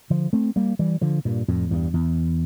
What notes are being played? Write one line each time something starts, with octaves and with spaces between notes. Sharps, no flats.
D3 F3
A3 C4
G3 A#3
E3 G3
D3 F3
G2 A#2
F2 A2
E2 G2
E2